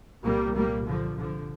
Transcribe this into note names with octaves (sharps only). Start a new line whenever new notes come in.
C2 A#2 G3 A#3
G3 A#3
D3 F3
D3 F3